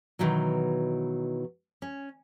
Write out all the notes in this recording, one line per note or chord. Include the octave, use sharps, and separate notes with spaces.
B2 D#3 E3 F#3
C#4